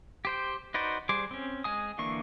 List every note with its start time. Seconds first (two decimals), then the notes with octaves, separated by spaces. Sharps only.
0.25 G4 C5 G5
0.74 D#4 F#4 B4 C5 D5
1.09 G3 G#4 C5 D6
1.31 C4 C#4
1.64 G#3 G#5 D#6
1.98 D3 E3 A#3 D4 C#6